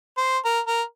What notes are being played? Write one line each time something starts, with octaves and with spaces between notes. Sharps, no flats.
C5
A#4
A#4